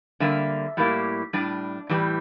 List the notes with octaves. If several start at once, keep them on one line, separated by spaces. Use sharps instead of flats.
D3 G3 A#3 E5
A2 G3 A#3 E4
A2 G3 D4 D5
A2 E3 G3